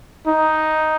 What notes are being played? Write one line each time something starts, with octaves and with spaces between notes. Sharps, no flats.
D#4